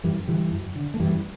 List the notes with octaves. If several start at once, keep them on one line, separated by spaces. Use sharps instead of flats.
F#2 E3 G3
D3 E3 G3
F#2
D3
A3
F#2 E3 G3